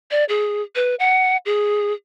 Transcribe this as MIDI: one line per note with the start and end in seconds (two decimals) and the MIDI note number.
0.11 0.24 74
0.29 0.62 68
0.76 0.95 71
1.00 1.37 78
1.46 1.93 68